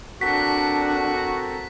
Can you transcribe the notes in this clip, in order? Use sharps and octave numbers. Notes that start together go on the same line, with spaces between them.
C4 D4 F#4 A4 A#4 B6